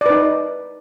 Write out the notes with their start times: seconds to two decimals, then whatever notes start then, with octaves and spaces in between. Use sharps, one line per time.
0.01 D5
0.06 B4
0.10 D#4